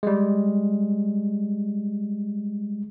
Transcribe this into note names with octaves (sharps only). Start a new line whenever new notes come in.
G3 G#3